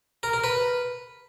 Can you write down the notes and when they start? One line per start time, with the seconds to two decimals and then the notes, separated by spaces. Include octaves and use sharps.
0.23 A#4
0.33 A#4
0.44 B4